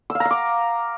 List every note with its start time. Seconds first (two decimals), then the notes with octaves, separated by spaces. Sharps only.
0.10 E6
0.15 F5
0.20 A#5
0.25 F5
0.31 D6